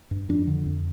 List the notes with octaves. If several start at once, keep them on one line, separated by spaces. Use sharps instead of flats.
G2
F2 D4
D3
F2